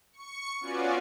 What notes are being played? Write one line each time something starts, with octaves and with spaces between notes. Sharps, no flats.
C#6 C#7
B3 C#4 F4 F#4 D5 G#5